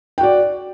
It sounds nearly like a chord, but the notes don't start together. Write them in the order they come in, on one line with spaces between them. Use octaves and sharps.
G5 F#4 D5